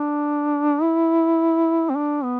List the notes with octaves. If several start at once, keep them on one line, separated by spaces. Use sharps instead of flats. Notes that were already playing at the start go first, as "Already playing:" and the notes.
Already playing: D4
E4
C4
D4
B3